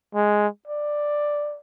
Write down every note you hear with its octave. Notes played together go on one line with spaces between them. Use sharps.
G#3
D5